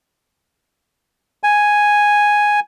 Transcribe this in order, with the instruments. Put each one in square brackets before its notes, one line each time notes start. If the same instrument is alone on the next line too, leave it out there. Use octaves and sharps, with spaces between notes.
[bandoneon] G#5